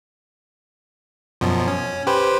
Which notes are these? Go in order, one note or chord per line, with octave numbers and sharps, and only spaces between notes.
F#2 B2 F3
C#4
G4 B4 C5